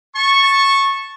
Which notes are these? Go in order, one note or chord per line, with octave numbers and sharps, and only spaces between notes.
A5 C#6